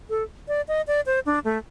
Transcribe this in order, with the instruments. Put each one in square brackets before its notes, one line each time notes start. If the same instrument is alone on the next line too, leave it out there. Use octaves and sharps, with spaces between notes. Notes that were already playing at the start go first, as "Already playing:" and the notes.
[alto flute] A4
D5
D#5
D5
C5
D4
A3